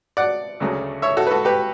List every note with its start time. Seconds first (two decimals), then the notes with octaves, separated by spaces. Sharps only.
0.17 D5 F#5
0.60 D2 C#3 F#3 A3
1.02 C#5 E5
1.17 F#4 A4
1.27 B4
1.31 F#4 A4
1.45 G4 B4